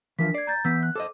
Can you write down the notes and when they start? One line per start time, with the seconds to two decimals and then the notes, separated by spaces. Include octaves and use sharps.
0.19 E3 F3 D4 F4 A#4 B6
0.34 D5 G#6 C7
0.47 A#5 G6 A6
0.65 E3 B3 E6 G6 B6
0.83 F#6
0.95 A4 C5 D#5 D6